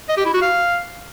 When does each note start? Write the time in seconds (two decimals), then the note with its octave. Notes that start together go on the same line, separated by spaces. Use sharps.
0.09 D#5
0.17 G4
0.25 E4
0.34 F#4
0.42 F5